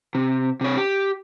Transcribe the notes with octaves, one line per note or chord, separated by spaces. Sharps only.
C3
C3 C#5
G4